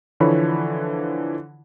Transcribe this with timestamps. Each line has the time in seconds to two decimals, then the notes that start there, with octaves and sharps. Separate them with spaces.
0.20 D3 E3 F3 C#5 B5